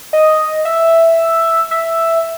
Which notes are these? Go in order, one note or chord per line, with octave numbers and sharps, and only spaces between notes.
D#5
E5
E5